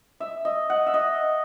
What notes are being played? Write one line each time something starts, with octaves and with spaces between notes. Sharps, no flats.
E5
D#5
F#5
E5
D#5